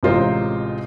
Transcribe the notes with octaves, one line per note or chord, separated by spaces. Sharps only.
A1 C3 G#3 F4 A#4 C5